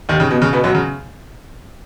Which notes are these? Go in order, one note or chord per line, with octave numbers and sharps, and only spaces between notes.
D#2 D#3
C#3
B2
C#3
B2 B3
F#2 F#3
C#3